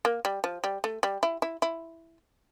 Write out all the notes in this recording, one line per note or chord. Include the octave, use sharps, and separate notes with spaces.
A#3
G3
F3
G3
A3
G3
E4
E4
E4